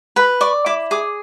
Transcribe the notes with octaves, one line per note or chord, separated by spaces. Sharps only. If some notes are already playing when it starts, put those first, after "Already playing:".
B4 B5
D5 C#6
E4 D6
G#4 D6